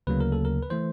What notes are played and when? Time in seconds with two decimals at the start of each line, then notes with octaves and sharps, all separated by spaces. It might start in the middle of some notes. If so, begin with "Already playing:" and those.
0.07 D2 C#3 F#3 A#3 B4
0.20 A#4
0.32 A4
0.45 A#4
0.63 B4
0.70 E3 A3 C5